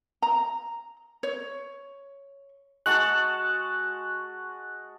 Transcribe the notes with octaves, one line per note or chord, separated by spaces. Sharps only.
A#5
C#5
G#3 F#4 A5 C#6 F#6